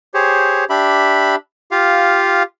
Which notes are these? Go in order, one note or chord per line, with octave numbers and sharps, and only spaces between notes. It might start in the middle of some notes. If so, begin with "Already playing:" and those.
G4 G#4 C5 C#5
D4 G4 E5 B5
F4 G4 F5